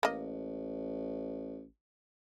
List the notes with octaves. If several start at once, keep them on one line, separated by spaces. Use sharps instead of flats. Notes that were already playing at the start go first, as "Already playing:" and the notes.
A1 A#3 D#5